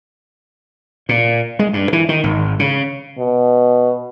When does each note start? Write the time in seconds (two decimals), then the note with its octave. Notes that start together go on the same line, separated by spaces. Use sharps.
1.09 A#2
1.59 G#3
1.73 G2
1.93 E3
2.09 D#3
2.24 G#1
2.59 C#3
3.18 B2